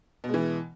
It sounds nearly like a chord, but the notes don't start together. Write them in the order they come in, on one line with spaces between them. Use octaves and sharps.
B2 G#3 E3